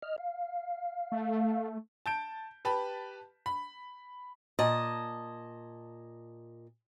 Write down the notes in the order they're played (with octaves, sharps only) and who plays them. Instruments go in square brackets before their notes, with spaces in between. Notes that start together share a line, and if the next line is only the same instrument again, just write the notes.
[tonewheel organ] D#5 F6
F5
[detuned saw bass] A3
[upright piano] A5 G6 D7
G4 B4 A5 B5
B5
[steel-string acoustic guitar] A#2 D#5 A5